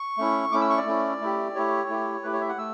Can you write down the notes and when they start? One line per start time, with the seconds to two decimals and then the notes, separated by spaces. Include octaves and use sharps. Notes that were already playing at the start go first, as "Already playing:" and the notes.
Already playing: C#6
0.17 A3 C#4 E4
0.52 A3 C#4 E4 D6
0.61 E6
0.70 C#6
0.77 D5
0.86 A3 C#4 E4
1.21 A3 E4 G4
1.55 A3 E4 G4 C#5
1.89 A3 E4 G4
2.23 A3 E4 G4 B4
2.33 C#5
2.41 E5
2.49 F#5
2.58 A3 E6